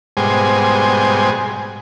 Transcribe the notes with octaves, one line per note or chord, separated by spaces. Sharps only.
G#2 B2 G3 G#3 C5 G#5